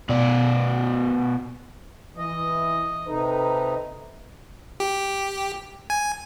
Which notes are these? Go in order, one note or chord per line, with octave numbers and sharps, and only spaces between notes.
B2 D5
E3 D#5
C3 D#4 A4 B4
G4
G#5